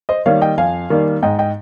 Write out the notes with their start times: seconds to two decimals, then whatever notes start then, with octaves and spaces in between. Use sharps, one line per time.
0.09 C5 D#5
0.26 D#3 G3 A#3 C#5 F5
0.41 D#5 G5
0.57 F2 F5 G#5
0.90 D#3 G3 A#3
1.23 G#2 D#5 G5
1.39 D#5 G5